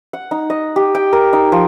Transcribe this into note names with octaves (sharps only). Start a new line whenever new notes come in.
F#5
D#4
D#5
G4
G5
A#4
D#4
F3